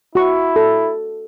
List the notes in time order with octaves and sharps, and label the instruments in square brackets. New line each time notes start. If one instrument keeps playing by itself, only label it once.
[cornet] E4 [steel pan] F#4 C#6
[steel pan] A4